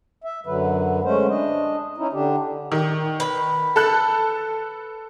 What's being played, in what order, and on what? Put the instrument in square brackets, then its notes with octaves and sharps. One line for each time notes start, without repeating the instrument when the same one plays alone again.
[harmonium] E5
F#2 D3 F#3 B4
G#3 A3 C#4 C5
D4 D#5
C#4 D#4 E4
D3 D4 G4
[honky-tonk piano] D#3
[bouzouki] B4
[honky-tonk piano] A4 A5 F#6